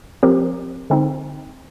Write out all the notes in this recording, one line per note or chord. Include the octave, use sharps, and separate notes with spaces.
F3 C4 G4 A#4
D3 G#3 C4 D#4